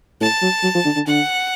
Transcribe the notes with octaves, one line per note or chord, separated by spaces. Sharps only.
A2 A5
F#3
F#3
F3
D3
D3
D3 F#5